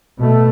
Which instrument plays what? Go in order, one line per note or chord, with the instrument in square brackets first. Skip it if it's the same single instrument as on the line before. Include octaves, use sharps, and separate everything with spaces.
[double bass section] B2 A3